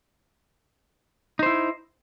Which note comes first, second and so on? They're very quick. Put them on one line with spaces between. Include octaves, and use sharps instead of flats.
D#4 C5 E4